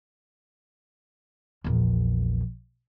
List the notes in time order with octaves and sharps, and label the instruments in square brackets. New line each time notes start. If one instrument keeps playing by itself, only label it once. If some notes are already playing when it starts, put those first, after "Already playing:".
[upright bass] A#1 E2